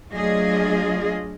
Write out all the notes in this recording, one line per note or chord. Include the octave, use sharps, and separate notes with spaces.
F#3 A3 D4 F4 G#4 D#5